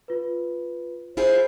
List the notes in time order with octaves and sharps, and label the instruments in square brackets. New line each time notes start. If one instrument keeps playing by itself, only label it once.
[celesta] F4 B4
[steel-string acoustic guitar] E4 F4 G#4 [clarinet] C5